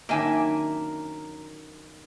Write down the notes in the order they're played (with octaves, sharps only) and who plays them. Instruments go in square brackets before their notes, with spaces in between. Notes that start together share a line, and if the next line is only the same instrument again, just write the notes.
[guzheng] F#2 D#3 D4 [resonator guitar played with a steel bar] A#3 E5 G#5